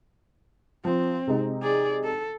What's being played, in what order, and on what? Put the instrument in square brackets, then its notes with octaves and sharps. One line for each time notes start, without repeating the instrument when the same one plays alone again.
[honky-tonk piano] F3 [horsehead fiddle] C4
[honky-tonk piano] C3 G#3 D#4
[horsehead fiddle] G#4 D5
A4